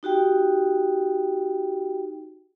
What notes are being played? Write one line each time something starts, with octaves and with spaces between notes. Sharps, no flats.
D#4 F#4 G4 G5